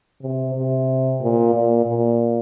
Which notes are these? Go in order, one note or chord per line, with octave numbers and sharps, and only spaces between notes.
C3
C3
A#2
A#2
A#2